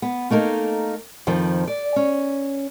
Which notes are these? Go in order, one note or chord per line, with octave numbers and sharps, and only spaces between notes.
B3
A3 A#3 D#4 A#4
F2 D#3 F3
D5
C#4